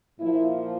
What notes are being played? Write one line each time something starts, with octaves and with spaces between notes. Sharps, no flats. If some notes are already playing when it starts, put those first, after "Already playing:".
A#2 F3 A#3 E4